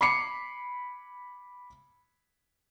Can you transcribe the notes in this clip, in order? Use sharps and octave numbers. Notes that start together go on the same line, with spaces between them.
B5 D6 C7 C#7